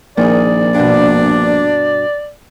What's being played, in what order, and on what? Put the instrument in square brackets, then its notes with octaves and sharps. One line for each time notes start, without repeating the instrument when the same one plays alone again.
[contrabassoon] A#1 [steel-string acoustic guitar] D#3 G#4 [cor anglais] D5
[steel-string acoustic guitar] G2 B2 [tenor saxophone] D4